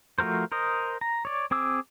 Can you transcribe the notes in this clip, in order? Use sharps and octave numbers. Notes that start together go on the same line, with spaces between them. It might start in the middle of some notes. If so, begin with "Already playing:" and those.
F3 A3 F#4 A#4 C5
A#4 C5 D#5
A#5
C#5 D5
C4 G#4 D6 E6